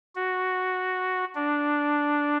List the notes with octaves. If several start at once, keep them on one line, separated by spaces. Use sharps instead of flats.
F#4
D4